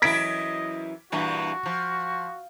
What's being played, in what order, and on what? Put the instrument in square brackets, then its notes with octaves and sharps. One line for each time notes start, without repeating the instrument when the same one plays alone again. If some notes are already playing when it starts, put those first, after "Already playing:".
[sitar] F#2 E3 E4 [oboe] D#5 [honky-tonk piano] G#6 B6 D7
[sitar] G2 A#2 E3 [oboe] F#4
[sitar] F3